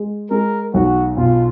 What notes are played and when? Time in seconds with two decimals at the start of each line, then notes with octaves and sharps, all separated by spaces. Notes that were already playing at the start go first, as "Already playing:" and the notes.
Already playing: G#3
0.31 G#3 A#4
0.74 B1 F#4
1.17 B2 F4